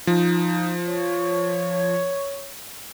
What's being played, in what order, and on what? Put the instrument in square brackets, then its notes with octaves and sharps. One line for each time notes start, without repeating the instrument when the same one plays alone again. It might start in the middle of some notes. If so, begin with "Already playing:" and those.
[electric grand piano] F3 [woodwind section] D#4
[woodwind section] C#5